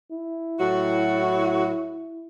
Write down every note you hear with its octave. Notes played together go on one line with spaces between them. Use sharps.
E4
A2 F#3 F#4